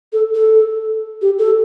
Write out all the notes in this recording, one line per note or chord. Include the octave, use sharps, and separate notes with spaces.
A4
A4
G4
A4